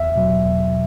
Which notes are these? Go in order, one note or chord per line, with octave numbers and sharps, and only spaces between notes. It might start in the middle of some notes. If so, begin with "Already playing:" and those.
Already playing: E2 E5
B2 F#3
E2
B2